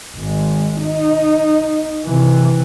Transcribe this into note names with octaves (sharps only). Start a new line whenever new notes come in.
G#1 G#3
D#4
C3 E3